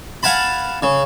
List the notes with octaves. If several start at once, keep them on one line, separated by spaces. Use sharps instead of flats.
F5 F#5 G#5 A5 B5
C#3